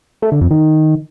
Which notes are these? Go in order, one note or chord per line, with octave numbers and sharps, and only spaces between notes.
A3
D3
F2
D#3